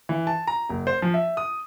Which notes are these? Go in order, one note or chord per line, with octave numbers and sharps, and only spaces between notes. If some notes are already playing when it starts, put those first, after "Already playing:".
E3
A5
A#5
F#1
C5
F3
E5
D#6